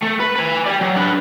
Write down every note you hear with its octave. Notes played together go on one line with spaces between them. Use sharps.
A3
B4
B4 G#5
G4 D5
F#3
D4 B4